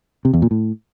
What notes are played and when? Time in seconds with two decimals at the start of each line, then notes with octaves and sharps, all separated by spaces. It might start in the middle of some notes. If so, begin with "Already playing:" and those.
0.25 C3
0.33 E2
0.42 A#2
0.51 A2